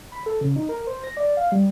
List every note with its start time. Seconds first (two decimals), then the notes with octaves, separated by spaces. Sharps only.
0.12 B5
0.26 A4
0.41 C#3
0.56 D#4
0.69 A#4
0.87 C5
1.04 A#6
1.17 D5
1.37 F5
1.52 G3